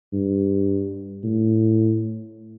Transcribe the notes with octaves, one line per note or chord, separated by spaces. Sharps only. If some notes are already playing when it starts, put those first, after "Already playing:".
G2
A2